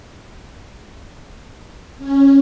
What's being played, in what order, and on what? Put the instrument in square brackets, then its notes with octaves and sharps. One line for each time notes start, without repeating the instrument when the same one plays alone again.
[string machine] C#4